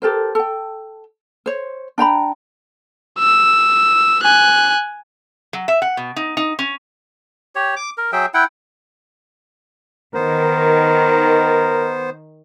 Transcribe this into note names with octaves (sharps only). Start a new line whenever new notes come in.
G4 A4 A#4 C5
A4 G5
C5 C#5
D4 G5 A#5 B5
E6
G#5 F#6
F#3
E5
F#5
B2
D#4
D#4
C#4
G4 C#5
D6
A#4
F#3 G#4 E5 G5
E4 F#5 G5
D#3 B3 A#4 C5